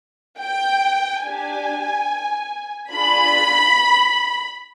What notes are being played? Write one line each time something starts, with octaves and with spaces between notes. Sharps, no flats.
G5
D4 G4 G#5
D4 F4 G#4 B5